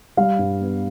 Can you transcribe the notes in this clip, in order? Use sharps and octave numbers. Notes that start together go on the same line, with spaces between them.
G3 F5
G2
B3